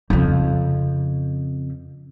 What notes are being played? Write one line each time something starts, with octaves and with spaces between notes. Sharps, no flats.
F2 C#3